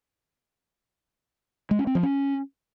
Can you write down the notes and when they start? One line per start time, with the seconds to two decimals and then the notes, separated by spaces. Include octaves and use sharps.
1.71 G#3
1.79 C#4
1.87 C4
1.95 F3
2.03 C#4